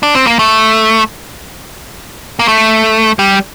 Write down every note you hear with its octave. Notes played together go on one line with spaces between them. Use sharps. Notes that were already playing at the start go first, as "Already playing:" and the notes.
D4
C4
A#3
A3
A#3
A3
G3